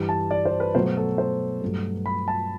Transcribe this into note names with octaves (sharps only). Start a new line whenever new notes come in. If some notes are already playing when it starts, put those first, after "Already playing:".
Already playing: G2 E3 G3
A5
D5
C5
B4
B2 F#3 A3 C5
A4
C5
G2 F#3 A3
B5
A5